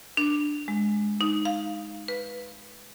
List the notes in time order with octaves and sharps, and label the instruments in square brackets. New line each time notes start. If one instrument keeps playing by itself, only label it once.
[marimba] D4
G#3
D#4
F5
B4